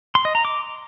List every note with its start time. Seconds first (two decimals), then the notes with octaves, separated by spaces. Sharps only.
0.15 C6
0.25 D#5
0.35 A#5
0.45 D6